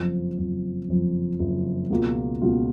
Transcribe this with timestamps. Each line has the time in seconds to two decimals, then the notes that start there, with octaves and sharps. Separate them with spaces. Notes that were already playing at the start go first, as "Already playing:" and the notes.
Already playing: F#1 F2 F3
0.38 F#1 F2 F3
0.88 F#1 F2 F3
1.39 F#1 F2 F3
1.90 C#2 B2 A#3 F4
2.42 C#2 B2 A#3 F4